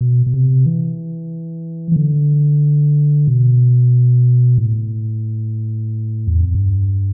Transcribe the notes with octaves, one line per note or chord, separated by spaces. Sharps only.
B2
B2
C3
E3
E3
D3
B2
A2
E2
F2
G2